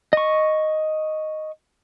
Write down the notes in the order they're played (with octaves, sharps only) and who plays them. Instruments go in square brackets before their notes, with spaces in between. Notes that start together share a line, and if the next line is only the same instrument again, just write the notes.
[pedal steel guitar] D#5 C#6